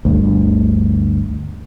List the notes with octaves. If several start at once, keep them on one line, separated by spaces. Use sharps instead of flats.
G1 D2